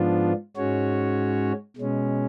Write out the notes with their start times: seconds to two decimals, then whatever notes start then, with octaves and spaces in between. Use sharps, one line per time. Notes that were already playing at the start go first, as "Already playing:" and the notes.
Already playing: G#2 F3 B3 D4 F4
0.56 G#2 G#3 C#4 F#4 C#5
1.76 B2 G#3 C#4